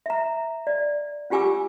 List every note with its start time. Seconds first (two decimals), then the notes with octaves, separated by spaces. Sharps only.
0.06 E5 A#5
0.67 D5
1.30 C#4 F4 G4 G#5 D6 E6